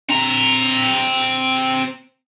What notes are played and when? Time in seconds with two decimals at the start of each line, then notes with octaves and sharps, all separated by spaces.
0.09 C4 A#5